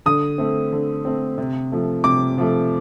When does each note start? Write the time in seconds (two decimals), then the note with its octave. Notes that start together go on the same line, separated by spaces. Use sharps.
0.06 D3 D#6
0.38 A3 C4
0.72 D3
1.05 A3 C4
1.38 C3
1.72 F3 A3
2.04 C3 D6
2.38 F3 A3